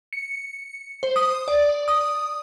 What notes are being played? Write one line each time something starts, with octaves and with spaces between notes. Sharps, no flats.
C#7
C5
D#6
D5
D#6